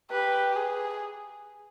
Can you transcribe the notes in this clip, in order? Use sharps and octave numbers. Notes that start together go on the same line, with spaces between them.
G4 B4
G#4